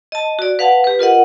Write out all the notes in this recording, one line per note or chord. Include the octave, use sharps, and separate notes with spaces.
D#5 A5
F#4 D5
B4 F5 F#5 A5
G4 B4
F4 A#4 D#5 F#5